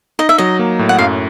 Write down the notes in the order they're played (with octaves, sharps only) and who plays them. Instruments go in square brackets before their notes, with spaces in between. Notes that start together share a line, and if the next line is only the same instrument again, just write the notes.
[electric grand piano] D#4 [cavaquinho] D#5
[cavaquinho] E5
[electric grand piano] F#3 [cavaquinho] D#5
[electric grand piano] A#3
A2
[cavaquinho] F#5
[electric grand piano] F#2 [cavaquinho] F5